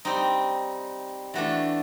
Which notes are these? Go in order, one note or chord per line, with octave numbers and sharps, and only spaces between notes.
G3 C4 D#4
E3 A3 D4 F#4 A4